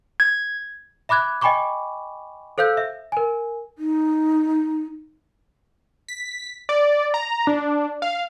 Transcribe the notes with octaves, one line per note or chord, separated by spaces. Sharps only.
G#6
E5 B5 D6 F#6 G#6
D#5 G5 G#5 B5 C#6 D6
A4 C5 F5 E6 G6
E5
A#4 G#5
D#4
B6
D5
A#5
D4
F5